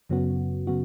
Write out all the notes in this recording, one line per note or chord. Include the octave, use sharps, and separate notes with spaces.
F#2 C#3 F#3 B3 F#4
C#3 F#3 B3 F#4